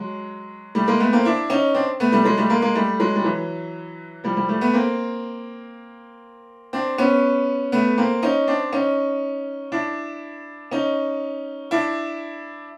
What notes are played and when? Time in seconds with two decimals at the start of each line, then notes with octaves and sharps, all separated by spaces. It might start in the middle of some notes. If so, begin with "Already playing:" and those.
Already playing: F#3 G#3
0.75 G3 A3
0.87 G#3 A#3
1.00 A3 B3
1.13 A#3 C4
1.25 D4 E4
1.50 C#4 D#4
1.74 C4 D4
2.00 A3 B3
2.12 G3 A3
2.25 F#3 G#3
2.37 G3 A3
2.50 G#3 A#3
2.62 G#3 A#3
2.75 G3 A3
3.00 F#3 G#3
3.16 G3
3.25 E3 F#3
4.24 F3 G3
4.36 F3 G3
4.49 G3 A3
4.61 A3 B3
4.74 A#3 C4
6.73 C4 D4
6.98 B3 C#4
7.72 A3 B3
7.98 A#3 C4
8.22 C#4 D#4
8.48 C4 D4
8.73 C#4 D#4
9.72 D4 E4
10.71 C#4 D#4
11.71 D4 E4